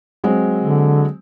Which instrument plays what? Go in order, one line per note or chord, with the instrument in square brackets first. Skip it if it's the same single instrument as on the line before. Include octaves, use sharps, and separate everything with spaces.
[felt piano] F#3 G#3 C4
[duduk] D3